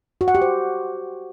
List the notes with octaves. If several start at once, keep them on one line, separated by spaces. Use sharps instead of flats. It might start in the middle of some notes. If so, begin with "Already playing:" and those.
F#4
F#5
G4
C5